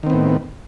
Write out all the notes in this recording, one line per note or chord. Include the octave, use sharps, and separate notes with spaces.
A2 D#3 B3 C4